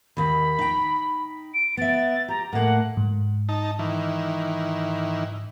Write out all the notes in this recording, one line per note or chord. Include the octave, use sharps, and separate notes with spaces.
D#2 D#3 B5
D#4 G5
D7
B3 E5 A6
G4 A#5
A2 A#3 F#5
G#2
D#4 A5
D#3 E3